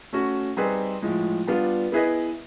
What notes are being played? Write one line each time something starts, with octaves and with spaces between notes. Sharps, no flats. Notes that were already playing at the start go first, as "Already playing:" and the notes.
A3 C#4 F#4
G3 C4 D#4 G#4 B4
A2 F3 G#3
G3 B3 D4 F4
B3 E4 G#4 B4 D#5